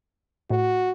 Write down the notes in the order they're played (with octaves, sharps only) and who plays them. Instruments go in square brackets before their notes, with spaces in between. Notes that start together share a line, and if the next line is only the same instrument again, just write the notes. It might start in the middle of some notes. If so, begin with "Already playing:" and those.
[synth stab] A2 [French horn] F#4